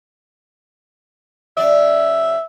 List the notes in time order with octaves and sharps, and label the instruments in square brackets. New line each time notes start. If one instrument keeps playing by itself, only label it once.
[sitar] C#3 F#3 D5 [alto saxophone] E5